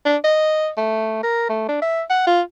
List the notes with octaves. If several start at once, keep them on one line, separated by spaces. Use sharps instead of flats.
D4
D#5
A3
A#4
A3
D4
E5
F#5
F4